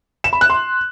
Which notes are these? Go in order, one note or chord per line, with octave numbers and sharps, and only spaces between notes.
E7
B5
F#6
C6